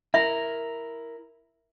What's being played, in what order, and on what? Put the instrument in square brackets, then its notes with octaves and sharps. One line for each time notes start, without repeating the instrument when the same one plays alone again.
[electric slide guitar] E4 A#4 [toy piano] E5